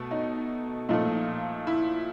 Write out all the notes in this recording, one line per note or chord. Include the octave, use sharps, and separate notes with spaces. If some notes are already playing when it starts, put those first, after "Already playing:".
Already playing: B2 A3
D#4
A#2 F3 A3 D#4
E4